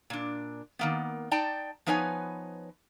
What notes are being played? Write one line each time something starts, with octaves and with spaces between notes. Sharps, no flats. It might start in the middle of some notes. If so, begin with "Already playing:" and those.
A#2 D4
D#3 A#3 B3
D#4 D5 G5 A5
F3 B3 D#4 B4 C#5 G#5